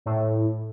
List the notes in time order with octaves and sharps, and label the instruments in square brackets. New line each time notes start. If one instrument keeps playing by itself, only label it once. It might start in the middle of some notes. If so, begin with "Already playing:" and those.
[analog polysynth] A2